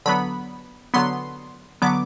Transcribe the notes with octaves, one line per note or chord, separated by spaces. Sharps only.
D3 F#3 B3 B5
D3 F#3 B3 C6
D3 F#3 B3 D6